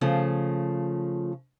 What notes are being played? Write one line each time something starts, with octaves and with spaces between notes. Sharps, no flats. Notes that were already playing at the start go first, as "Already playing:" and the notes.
C#3 F3 A3